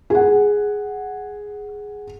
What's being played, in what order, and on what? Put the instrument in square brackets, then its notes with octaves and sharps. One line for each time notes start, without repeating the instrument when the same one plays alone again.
[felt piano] G#4 F#5